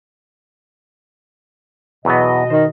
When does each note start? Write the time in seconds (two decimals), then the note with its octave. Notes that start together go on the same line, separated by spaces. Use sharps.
2.05 E2 B2 F#3 B3 D#5
2.50 D#3 C5